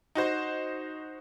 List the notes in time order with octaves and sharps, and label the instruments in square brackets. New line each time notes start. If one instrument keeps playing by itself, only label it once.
[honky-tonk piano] D#4 F#4 C5